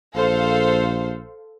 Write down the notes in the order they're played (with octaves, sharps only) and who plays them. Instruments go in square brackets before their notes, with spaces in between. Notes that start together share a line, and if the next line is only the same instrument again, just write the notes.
[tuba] A#1 [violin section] A4 C5 F5